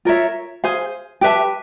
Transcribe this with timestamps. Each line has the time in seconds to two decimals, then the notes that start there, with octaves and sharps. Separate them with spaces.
0.05 F4 A#4 C#5 E5
0.64 G#4 C5 F5 G#5
1.21 G4 B4 E5 A5